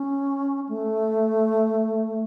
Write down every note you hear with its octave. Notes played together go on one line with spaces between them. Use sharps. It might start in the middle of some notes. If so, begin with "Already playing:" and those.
Already playing: C#4
A3